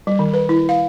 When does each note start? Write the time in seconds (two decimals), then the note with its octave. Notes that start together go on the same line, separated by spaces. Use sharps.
0.07 G3
0.19 D#3
0.33 B4
0.49 E4
0.69 F5